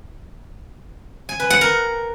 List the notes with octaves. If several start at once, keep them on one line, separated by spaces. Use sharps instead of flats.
G#5
B4
F#5
A#4